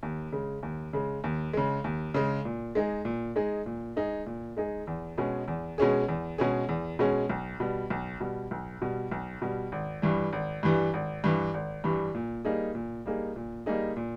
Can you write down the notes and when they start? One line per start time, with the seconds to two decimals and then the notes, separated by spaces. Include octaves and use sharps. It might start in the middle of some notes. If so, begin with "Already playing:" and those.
0.03 D#2
0.32 C#3 G#3
0.63 D#2
0.93 C#3 G#3
1.24 D#2
1.53 C#3 G#3
1.84 D#2
2.14 C#3 G#3
2.45 A#2
2.75 G#3 D#4 G#4
3.05 A#2
3.36 G#3 D#4 G#4
3.66 A#2
3.96 G#3 D#4 G#4
4.26 A#2
4.57 G#3 D#4 G#4
4.87 E2
5.18 B2 G#3 C#4 G#4
5.48 E2
5.78 B2 G#3 C#4 G#4
6.08 E2
6.38 B2 G#3 C#4 G#4
6.69 E2
6.99 B2 G#3 C#4 G#4
7.30 B1
7.60 B2 G3
7.90 B1
8.20 B2 G3
8.51 B1
8.82 B2 G3
9.11 B1
9.42 B2 G3
9.72 G#1
10.02 G2 E3 G3
10.33 G#1
10.63 G2 E3 G3
10.94 G#1
11.24 G2 E3 G3
11.54 G#1
11.84 G2 E3 G3
12.15 A#2
12.45 G3 A#3 D#4 G#4
12.75 A#2
13.06 G3 A#3 D#4 G#4
13.36 A#2
13.66 G3 A#3 D#4 G#4
13.97 A#2